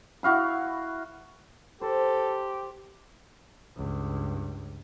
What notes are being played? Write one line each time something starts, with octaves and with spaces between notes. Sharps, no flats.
E4 F#4 F5 B5
G4 A4 C5
C#2 G2